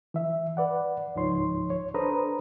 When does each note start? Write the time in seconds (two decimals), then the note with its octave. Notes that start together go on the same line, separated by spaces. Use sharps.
0.14 E3 E5
0.57 B4 D5 F#5
1.16 C#2 G#2 F3 D#4 C#5 C6
1.70 C#5
1.94 D4 A4 B4 C5 A#5 D#6